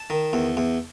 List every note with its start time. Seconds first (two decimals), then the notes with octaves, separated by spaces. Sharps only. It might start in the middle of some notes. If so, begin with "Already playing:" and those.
Already playing: A5
0.10 D#3
0.33 E2
0.57 E2